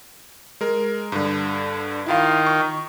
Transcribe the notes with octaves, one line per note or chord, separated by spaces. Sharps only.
G#3 A#4
G2 D3
D#3 E4 F4 F5
C#6